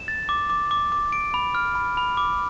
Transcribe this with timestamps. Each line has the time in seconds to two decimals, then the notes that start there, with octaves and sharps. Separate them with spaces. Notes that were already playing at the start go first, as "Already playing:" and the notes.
Already playing: E7
0.08 A6
0.29 D6
0.50 D6
0.71 D6
0.92 D6
1.12 D7
1.34 B5
1.55 F6
1.75 B5
1.97 B5
2.17 D6